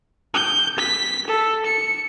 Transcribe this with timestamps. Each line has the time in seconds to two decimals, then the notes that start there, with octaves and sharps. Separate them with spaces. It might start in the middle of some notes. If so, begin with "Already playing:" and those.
0.34 G6
0.78 B6
1.27 A4
1.66 C#7